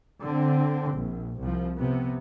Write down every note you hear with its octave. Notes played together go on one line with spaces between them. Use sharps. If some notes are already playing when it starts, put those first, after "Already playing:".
D3 C4
A#1
C2 F3
C3 B3